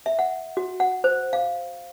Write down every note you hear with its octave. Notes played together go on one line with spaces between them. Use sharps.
E5
F#5
F#4
F#5
C5
F5